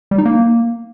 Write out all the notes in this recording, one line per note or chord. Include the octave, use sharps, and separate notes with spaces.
G3
D#4
A#3